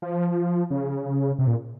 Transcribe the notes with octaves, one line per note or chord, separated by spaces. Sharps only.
F3
C#3
C3
A#2